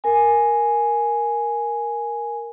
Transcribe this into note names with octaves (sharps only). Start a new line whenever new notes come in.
A#4 G#5